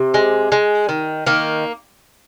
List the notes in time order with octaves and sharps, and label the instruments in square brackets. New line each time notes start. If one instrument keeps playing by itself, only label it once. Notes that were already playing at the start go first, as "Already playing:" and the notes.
Already playing: [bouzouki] C3
G#3
G#3
D#3
D#3 A#3